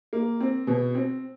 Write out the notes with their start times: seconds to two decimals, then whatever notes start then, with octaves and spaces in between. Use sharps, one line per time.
0.13 A#3
0.40 C4
0.67 B2
0.95 C4